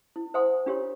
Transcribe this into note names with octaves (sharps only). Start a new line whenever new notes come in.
E4
C5 E5 F#5 G#5 C6 D#6
D4 F4 G4 A#4 C#5 C6